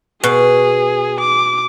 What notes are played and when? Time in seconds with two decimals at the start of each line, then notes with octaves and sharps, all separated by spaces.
0.24 B2 G#4
1.20 D6